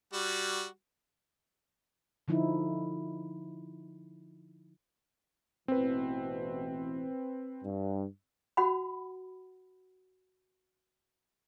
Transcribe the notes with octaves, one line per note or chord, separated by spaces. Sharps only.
G3 F#4
D3 F3 D#4 E4
A1 B2 E3 C4 B4
G2
F#4 F#5 B5